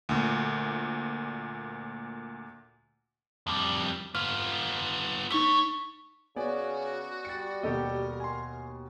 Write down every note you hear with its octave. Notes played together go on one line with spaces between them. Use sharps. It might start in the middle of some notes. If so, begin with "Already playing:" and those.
D2 A#2
F2 G3
B3 F4 F6
A3 D#4 C#5 C#6 B6
C#3 B3 F#4 D5 G#5
G3 A6 C#7
D#2 B2 G4 A4 A#4 D#5
G#5 C6